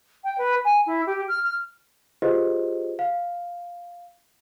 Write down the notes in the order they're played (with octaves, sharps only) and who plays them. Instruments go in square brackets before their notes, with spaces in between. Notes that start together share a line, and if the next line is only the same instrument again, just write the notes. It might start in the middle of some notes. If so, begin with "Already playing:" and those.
[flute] G5
B4
G#5
E4
G4
F6
F6
[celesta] F4 G4 G#4 B4 C5 D#5
F5